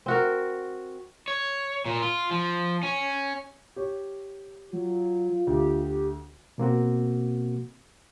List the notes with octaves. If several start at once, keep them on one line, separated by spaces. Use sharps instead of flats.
C4 F#4 A#4
C#5
A#2
F4
F3
C#4
G4 C#5
F#3 F4
D2 G4
B2 A#3 C4 F#4